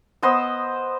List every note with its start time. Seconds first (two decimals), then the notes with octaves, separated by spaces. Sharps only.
0.23 B3 C5 D#5 E6